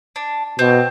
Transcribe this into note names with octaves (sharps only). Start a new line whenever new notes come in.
D4
B2 C4